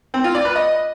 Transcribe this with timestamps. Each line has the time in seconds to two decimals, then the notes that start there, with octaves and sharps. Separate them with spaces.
0.14 C4
0.24 F4
0.35 D5
0.45 B4
0.56 D#5